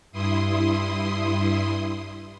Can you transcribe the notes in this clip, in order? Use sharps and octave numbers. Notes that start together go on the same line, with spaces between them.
G2 E4 C6 D#6